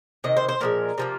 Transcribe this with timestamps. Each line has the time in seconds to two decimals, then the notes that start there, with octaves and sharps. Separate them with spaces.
0.24 C3 D#3 D#5
0.37 C5
0.49 C5
0.61 A#2 F3 G#3 A#4
0.98 C3 F3 A#3